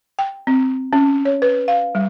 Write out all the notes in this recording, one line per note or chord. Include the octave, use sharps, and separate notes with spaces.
G5
C4
C#4
C#5
B4
F5
G3